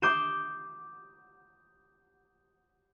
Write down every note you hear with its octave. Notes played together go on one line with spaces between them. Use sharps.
D6 D#6 G6 C7 D#7 E7